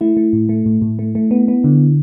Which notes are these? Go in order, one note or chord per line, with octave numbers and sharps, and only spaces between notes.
A3 E4
A3
A2
A3
A2
A2
A3
A3
B3
B3
D3